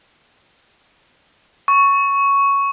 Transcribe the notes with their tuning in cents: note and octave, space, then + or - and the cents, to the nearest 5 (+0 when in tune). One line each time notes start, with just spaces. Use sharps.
C#6 +5